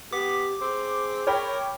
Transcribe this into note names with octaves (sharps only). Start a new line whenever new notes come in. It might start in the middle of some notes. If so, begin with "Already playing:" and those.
B3 G4 D6
C4 G#4
A#4 C#5 G5 B5